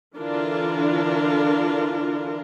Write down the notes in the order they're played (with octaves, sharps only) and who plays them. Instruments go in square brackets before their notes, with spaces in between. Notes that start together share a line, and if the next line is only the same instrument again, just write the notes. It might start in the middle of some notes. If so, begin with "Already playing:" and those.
[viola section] D3 E3 D4 F4 A#4